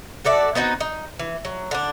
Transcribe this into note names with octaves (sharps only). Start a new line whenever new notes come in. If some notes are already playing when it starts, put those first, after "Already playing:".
F#4 A4 D5 E5
B3 C4 D#4 F#4
D#4
E3
F#3
D3 D4